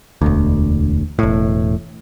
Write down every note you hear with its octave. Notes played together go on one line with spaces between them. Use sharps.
E1 D2
E1 A2